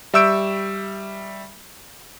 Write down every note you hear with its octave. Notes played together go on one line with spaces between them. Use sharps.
G3 E5 C#6 E6 G6 D7